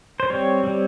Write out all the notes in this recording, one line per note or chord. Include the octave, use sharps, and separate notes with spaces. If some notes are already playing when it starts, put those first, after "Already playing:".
C5
G3 C4 C#5
G3 C4